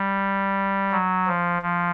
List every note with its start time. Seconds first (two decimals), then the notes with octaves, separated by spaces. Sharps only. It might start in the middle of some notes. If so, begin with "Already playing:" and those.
Already playing: G3
0.92 F#3
1.27 F3
1.62 F3